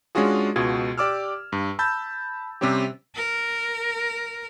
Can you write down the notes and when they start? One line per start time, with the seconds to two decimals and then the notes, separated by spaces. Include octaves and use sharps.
0.15 G#3 C#4 D4 F4 F#4 G#4
0.56 C#2 B2 F4 F#4 G#6
0.98 G4 D5 D6 E6 F6
1.52 G2
1.79 A5 B5 E6 G6 A6
2.61 C3 G3 C4 C#4 G4
3.15 A#4